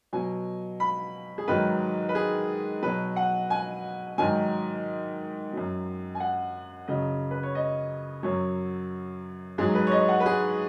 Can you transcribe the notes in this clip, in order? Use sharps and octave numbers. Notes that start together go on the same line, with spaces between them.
B2 F#3 G#5
B5
G#4
G#2 D#3 F#3 B4
B4
G#4
B2 F#3 B4
F#5
G#5
G#2 D#3 F#3 G#5
F#2 F#3
G#5
F#5
F#2 C#3 F#3 D#5
B4
C#5
D#5
F#2 F#3 C#5
G#2 F#3 G#4
B4
C#5
D#5
F#5
B4
G#4